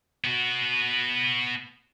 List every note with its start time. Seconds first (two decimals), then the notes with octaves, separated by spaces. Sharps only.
0.24 B3 F#4